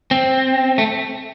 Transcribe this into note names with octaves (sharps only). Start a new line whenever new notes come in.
C4
A3